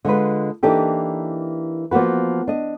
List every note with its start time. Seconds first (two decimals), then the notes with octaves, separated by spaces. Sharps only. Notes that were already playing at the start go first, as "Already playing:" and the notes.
0.05 D3 G#3 F4 B4
0.63 E3 A#3 D4 D#4 G4 A4
1.91 F3 A#3 B3 F#4 B4
2.48 D4 D#5